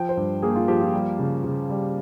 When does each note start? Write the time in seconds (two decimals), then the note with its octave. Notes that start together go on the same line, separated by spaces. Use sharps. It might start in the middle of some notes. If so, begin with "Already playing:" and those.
Already playing: F3 G5
0.09 C5
0.17 G2
0.42 A#3 G#4
0.55 F4
0.68 F3 G4
0.81 F4
0.93 G3
1.19 C#3
1.44 C#3
1.70 G3